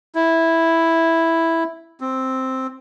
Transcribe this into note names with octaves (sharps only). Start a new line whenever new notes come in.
E4
C4